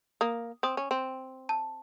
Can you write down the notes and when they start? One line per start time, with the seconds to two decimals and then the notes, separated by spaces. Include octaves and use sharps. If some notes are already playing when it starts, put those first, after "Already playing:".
0.21 A#3 D#6
0.63 C4 D#6
0.77 C#4
0.91 C4
1.49 A5